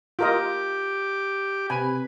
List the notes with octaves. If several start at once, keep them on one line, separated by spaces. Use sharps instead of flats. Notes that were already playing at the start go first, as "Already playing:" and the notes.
F4 G4 A#4 D#5 D6
C3 B4 G#5 B5